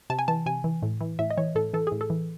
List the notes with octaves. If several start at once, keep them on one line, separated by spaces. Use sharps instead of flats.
C3 A5
G#5
E3 A5
C3 G#5
E3
A2
E3
A2 E5
D#5
E3 C#5
A2 A4
E3 A4
A2 G#4
A4
E3